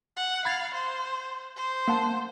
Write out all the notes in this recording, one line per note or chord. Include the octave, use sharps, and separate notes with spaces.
F#5
F5 B5 G#6 A6
C5
C5
A#3 F#5 A5